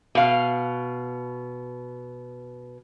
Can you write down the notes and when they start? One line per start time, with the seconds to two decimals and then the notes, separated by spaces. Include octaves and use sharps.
0.15 B2 F5